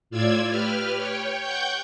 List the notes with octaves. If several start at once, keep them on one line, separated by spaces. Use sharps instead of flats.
A2 F4 D5 E6 G#6
G4 B4 F6
C#5 G5
F#5 G5 C#6 G6